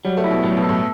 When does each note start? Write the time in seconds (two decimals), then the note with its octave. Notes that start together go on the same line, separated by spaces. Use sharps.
0.05 F#3 G3
0.17 A3
0.24 E4
0.31 B2
0.43 A2 F#3
0.57 B2
0.63 A4
0.69 A2